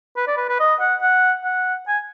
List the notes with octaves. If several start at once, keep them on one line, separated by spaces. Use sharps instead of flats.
B4
D5
B4
B4
D#5
F#5
F#5
F#5
G#5